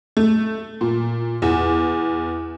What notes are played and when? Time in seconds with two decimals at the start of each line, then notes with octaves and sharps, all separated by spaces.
0.17 A3
0.81 A#2
1.42 E2